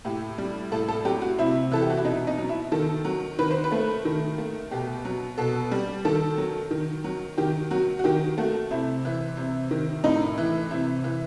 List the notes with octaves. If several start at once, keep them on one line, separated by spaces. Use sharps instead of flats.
A2 G4
G3
A2 A4
A4
F#3 G4
F#4
C3 E4
E3 A4
G4
F#4
E4
B2 D#4
D#4
F#3
E4
D#3 A4
F#3
D#3 B4
C5
B4
A3
D#3
A3
B2 G4
F#3
B2 A4
G3
D#3 A4
F#3
D#3
F#3
D#3 G4
F#3 F#4
F#4
D#3 G4
A3 F#4
C3 E4
E3
C3
D#3
A2 D#4
E3
C3 E4
E3